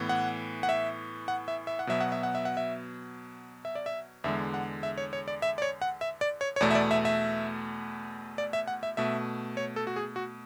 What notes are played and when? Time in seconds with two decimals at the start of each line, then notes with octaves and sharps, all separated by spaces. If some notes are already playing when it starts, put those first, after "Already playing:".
Already playing: A2 E3 B3
0.09 F#5
0.63 F#5
0.69 E5
1.28 F#5
1.48 E5
1.67 E5
1.79 F#5
1.87 B2 F#3 B3 E5
2.00 F#5
2.12 E5
2.23 F#5
2.35 E5
2.45 F#5
2.57 E5
3.65 E5
3.75 D5
3.86 E5
4.24 E2 D3 G#3 E5
4.54 F#5
4.83 E5
4.98 C#5
5.13 C#5
5.28 D5
5.42 E5
5.58 D5
5.62 C#5
5.82 F#5
6.01 E5
6.21 D5
6.41 C#5
6.56 C#5
6.61 E2 B2 A3 D5
6.71 E5
6.75 D5
6.91 E5
7.05 E5
8.38 D5
8.53 E5
8.67 F#5
8.83 E5
8.97 B2 A3 E5
9.57 C#5
9.76 A4
9.87 F#4
9.96 G#4
10.16 F#4